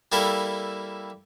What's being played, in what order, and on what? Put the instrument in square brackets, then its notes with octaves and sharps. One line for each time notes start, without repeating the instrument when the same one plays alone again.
[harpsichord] G3 A#3 E4 A4